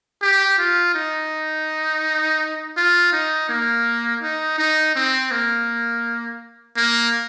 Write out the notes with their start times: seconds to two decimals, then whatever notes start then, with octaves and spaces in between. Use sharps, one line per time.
0.22 G4
0.58 F4
0.95 D#4
2.77 F4
3.13 D#4
3.49 A#3
4.22 D#4
4.58 D#4
4.96 C4
5.31 A#3
6.77 A#3